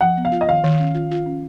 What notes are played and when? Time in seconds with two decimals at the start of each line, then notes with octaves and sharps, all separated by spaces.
0.01 F3 F#5
0.17 B3
0.25 F5
0.32 F4
0.41 D#5
0.48 D#3 F5
0.64 D#3
0.80 C#4
0.94 F4
1.11 F4
1.26 C#4